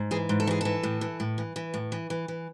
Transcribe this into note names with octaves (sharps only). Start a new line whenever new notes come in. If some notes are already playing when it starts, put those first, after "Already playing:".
Already playing: G#2
E3 G#4
G#2
A4
E3 G#4
E3 A4
A2
E3
A2
E3
E3
A2
E3
E3
E3